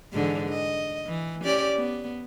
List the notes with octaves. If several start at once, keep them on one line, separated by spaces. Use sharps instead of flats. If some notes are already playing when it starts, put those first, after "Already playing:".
G#2 D3 E3
D#5
E3
C#4 G4 D5
B3